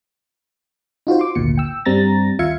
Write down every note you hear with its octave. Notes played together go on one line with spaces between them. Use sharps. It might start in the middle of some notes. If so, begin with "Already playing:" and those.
D#4 F4 F#4 C5
C6 D6
G#1 D2 A#2 C#7
G5 E6
G2 G3 C4 A#5 A6 A#6
D#2 F4 E5 F5 G#6 C#7